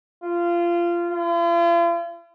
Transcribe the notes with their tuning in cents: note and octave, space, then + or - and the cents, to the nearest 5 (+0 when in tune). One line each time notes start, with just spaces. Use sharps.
F4 -20
F4 -45